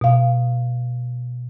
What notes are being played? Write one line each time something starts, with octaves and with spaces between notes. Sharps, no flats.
B2 F5